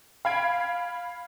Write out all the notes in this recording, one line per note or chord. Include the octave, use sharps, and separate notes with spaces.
F5 B5 G#6 D7